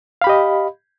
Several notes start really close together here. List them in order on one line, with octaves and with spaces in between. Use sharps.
F5 B5 G4 D#5